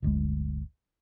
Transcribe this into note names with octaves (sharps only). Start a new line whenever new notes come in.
D1 G1 D2 G#3